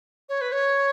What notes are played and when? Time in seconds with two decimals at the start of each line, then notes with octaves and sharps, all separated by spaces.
0.29 C#5
0.41 B4
0.52 C#5